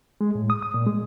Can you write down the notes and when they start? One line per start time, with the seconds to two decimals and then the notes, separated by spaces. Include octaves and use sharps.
0.21 G#3
0.35 A2
0.50 D#6
0.63 D#6
0.74 A#2
0.86 G#3